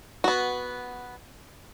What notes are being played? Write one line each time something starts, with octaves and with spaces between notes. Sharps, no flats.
B3 F#4